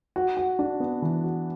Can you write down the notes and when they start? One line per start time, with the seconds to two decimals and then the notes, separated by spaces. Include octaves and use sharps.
0.16 F#4
0.37 F#4
0.59 D4
0.80 B3
1.02 E3
1.23 F#4